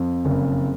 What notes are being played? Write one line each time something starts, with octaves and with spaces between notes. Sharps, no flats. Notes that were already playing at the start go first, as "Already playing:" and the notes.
Already playing: F2
F#1